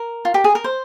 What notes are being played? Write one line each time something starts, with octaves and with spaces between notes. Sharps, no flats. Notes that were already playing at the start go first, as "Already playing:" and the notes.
Already playing: A#4
F4
G4
G#4
A#4
C5